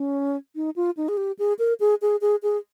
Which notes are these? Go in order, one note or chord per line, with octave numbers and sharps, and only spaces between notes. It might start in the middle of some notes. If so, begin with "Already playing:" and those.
Already playing: C#4
D#4
F4
D#4
G#4
G4
G#4
A#4
G#4
G#4
G#4
G#4